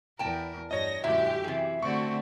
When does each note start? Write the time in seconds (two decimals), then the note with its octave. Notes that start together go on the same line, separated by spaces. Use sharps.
0.19 E2 A#4 G5 A5
0.71 G2 C#5 D#5 A#6
1.04 F#2 A#2 D3 G#3 E4 G4 E5
1.44 C3 E3 G#4
1.82 D3 A3 C4 F#4 C#6